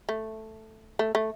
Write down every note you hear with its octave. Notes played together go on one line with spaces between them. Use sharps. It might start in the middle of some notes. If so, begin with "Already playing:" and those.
A3
A3
A3